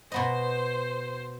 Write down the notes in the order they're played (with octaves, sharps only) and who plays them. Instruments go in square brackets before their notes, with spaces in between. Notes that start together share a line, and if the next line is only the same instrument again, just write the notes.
[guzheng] B2 B3 D#5 [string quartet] C5